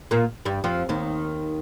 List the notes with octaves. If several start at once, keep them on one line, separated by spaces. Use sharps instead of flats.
A#2 A#3
G2 G3
F2 F3
D#2 D#3